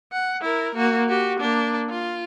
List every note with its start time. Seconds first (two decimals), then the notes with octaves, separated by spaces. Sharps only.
0.12 F#5
0.42 E4 A#4
0.75 A#3 F#4
1.08 F#4 G4
1.40 A#3 D4
1.89 F4